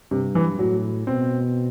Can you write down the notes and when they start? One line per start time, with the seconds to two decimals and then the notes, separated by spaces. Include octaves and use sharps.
0.11 G2 C3
0.35 E3
0.59 A2 F#3
1.07 B2 C4